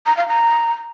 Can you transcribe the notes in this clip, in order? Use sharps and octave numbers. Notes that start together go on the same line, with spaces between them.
A#5
F5
A#5